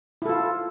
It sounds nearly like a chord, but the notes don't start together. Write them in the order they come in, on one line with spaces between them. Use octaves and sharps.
E4 A4 F4